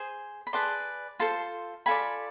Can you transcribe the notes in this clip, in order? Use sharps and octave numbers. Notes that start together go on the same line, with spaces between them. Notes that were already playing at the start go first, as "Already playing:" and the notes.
Already playing: G#4 C5
B5
G#4 B4 D5 A5 C6
F4 A4 C5 A5 C6
F4 A4 D5 G#5 B5